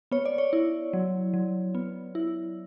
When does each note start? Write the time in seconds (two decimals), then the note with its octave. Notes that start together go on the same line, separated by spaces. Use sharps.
0.11 B3 C#5
0.25 D5
0.38 C#5
0.53 E4
0.93 F#3
1.34 F#3
1.75 B3
2.15 E4